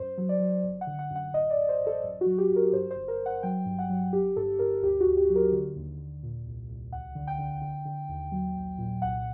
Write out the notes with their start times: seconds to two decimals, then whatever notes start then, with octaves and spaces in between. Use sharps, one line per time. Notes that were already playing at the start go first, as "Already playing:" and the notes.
Already playing: F#2 C5
0.18 F#3
0.29 D5
0.40 F#3
0.64 G1
0.81 F#5
0.87 D3
0.99 F#5
1.10 F#2
1.16 F#5
1.33 A1 D#5
1.50 D5
1.57 A1
1.69 C5
1.81 A1
1.86 A4
2.04 F#2
2.21 F#4
2.26 F#3
2.38 G4
2.50 F#2
2.56 A#4
2.73 G2 C5
2.91 C5
2.96 G1
3.08 A#4
3.20 G1
3.26 F#5
3.43 F#3 G5
3.66 G2
3.79 F#5
3.90 F#3
4.13 G1 G4
4.36 G2 A4
4.59 G2 A#4
4.82 D2 G4
5.00 F#4
5.07 D2
5.17 G4
5.30 F#3
5.35 A#4
5.52 D3
5.76 D#2
5.99 D#2
6.23 A#2
6.46 C2
6.69 C2
6.92 D2 F#5
7.15 D3
7.27 G5
7.38 D3
7.62 D3
7.85 D3
8.09 D#2
8.32 F#3
8.56 A#1
8.78 A#2
9.02 C2 F#5